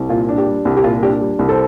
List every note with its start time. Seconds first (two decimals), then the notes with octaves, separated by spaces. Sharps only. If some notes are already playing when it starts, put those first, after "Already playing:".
Already playing: C2
0.09 A#2 F4
0.29 D4
0.38 G4
0.47 G3
0.65 C2 G4
0.77 G4
0.84 A#2 F4
1.03 D4 G4
1.21 G3
1.39 C2
1.49 A4 C5